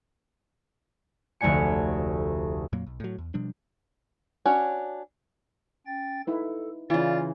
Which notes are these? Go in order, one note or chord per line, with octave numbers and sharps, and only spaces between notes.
F1 D2 A3 D4 G#5 C#7
F2 A#2 F#3 A#3
B1
A2 F#3
E2
B2 F3 G3 D4
C#4 D4 F#4 C#5
C#4 G5 A6
D#4 E4 A4 B4
C#3 E3 F4 D5 A6